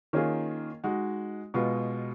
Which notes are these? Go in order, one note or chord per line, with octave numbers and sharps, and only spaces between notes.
D#3 A#3 C#4 F4 G#4
G#3 D#4 F#4
B2 G#3 B3 F4